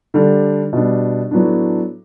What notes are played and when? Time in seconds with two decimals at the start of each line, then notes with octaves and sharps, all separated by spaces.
0.14 D3 G3 D4
0.73 B2 G3 D4
1.31 A2 F#3 B3 D4